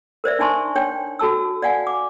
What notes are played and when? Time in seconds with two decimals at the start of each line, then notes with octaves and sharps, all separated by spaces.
0.24 A#4 C5 D5 E5
0.39 D4 D#4 G#5 A5 C6 C#6
0.75 D4 C#5 G5
1.19 F#4 A4 A5 E6
1.62 D5 F5 F#5 G#5
1.87 D6